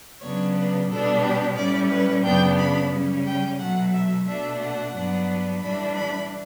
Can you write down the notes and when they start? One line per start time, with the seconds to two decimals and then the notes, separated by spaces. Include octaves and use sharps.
0.21 C#3 F#3 B3 D4 C#5
0.55 B4
0.89 B2 G3 B3 D4 A4
1.22 G4
1.55 A2 G3 C#4 D5
1.89 B4
2.23 F#2 C#3 F#3 B3 D4 G5
2.58 B5
2.91 C#3 G3 C#4
3.25 G5
3.58 B2 F#3 A3 F#5
3.93 E5
4.26 B2 A3 D4 E5
4.60 F#5
4.94 G2 F#3 B3 D4
5.62 A2 E3 G3 D4 B5
5.95 B5